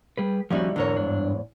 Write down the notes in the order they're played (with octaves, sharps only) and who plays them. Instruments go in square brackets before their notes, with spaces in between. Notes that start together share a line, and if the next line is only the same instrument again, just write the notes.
[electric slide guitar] G3 G#4 B4
[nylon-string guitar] D#2 G3 E5 [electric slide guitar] F3 C#4 F#4
[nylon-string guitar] E2 G#2 C#5 [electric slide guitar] D3 A#4
[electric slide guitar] G2 D4